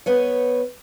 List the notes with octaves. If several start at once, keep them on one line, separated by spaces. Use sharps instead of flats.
B3 B4 C#5